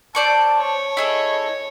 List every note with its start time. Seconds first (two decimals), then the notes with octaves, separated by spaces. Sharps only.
0.15 C5 D5 A5 C#6
0.58 C#5
0.97 E4 G#4 A4 D#5